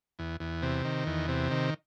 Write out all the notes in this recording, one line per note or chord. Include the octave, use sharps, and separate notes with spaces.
E2
E2
C3
D#3
E2
C3
D#3